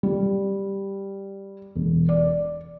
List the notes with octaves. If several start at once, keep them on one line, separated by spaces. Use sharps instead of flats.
G3
E1
D5